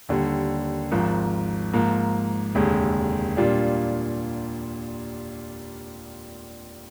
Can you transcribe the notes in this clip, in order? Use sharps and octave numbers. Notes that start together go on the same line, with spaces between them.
D#2 D3 G3
G#1 G#2 F3
G#2 F3 A#3
F1 D#2 D3 G#3
A#2 G3 D4 F4